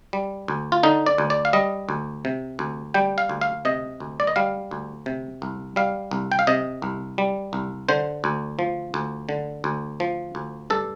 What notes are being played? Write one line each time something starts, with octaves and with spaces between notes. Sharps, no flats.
G3
D2
F4
D3 D#4
D5
D2
D5
F5
G3 D#5
D2
C3
D2
G3 G5
F5
D2
F5
C3 D#5
D2
D5
D#5
G3 F5
D2
C3
C2
G3 F5
C2
G5
F5
C3 D#5
C2
G3
C2
D3 C5
D2
F3
D2
D3
D2
F3
D2
G2 A4